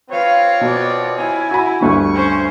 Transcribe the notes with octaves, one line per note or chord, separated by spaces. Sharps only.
C4 F4 B4 C#5 F5
B2 B3 D5
E4 G#5
F#4 B5
D2 G2 D3 C#6
C#4 C5